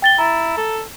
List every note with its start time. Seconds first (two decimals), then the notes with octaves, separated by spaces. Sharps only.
0.02 G5 A6 G7
0.19 E4 A#5 A6
0.57 A4